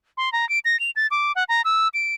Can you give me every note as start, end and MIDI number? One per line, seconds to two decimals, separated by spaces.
0.17 0.32 84
0.33 0.48 82
0.49 0.59 98
0.65 0.79 94
0.80 0.90 101
0.96 1.07 93
1.11 1.32 86
1.35 1.44 78
1.49 1.62 82
1.65 1.88 88
1.94 2.15 98